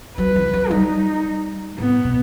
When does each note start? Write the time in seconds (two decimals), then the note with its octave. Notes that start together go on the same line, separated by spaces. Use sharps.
0.18 F#3 B4
0.36 E3
0.53 F#3
0.71 G3 D#4
1.78 A2 B3
2.04 B2